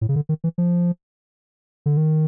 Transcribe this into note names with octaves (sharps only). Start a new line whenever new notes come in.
A2
C#3
D3
D#3
E3
F3
D3
D#3